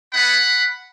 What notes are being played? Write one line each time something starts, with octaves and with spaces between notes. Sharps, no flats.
B3 E4 F#5 B5